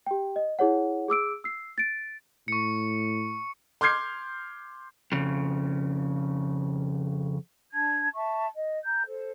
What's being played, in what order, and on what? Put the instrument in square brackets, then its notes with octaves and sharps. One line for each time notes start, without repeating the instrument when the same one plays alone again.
[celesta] G4 G5
D#5
E4 G#4 C#5 F#5
G#4 D6 E6 D7
E6 C7
A6 D7
[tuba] A2 [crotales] C#6 C#7
[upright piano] C6 D6 F6 G6 G#6 C7
[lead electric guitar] F2 C#3
[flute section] D4 A5 G#6
E5 A5 C#6
D#5
A#5 G6
A4 C5